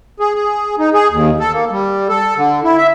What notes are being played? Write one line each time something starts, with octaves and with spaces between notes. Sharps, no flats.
G#4
G#4
D#4
G#4
D#2
A4
A#3
G3
A4
D3
E4
E5